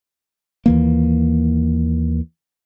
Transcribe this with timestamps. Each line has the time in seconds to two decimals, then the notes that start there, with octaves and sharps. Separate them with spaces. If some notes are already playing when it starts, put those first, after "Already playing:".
0.66 D#2 E3 A#3